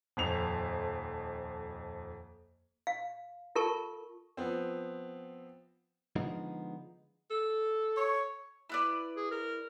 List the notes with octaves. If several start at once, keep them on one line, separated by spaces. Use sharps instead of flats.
D#1 F2 F7
F5
F4 A4 A#4 A5 C#6
F3 B3 C4
D3 F3 G#3 B3 D#4
A4
C#5
E4 B4 D5
G#4
A#4